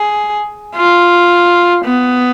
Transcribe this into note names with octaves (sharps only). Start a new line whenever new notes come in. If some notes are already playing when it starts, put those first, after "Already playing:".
Already playing: G#4
F4
B3